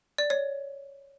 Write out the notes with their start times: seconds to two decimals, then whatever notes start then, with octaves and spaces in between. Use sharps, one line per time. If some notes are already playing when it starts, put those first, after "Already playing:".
0.18 D5
0.30 C#5